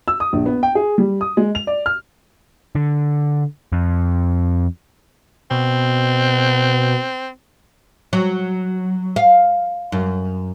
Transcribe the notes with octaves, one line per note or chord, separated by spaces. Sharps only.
E6
D#6
A#1
B3
G5
G#4
G3
D#6
G#3
F7
D5
F6
D3
F2
B2 C4
F#3
F5
F#2